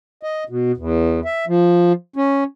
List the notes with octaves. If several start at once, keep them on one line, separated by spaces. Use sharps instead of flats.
D#5
B2
E2
E5
F3
C#4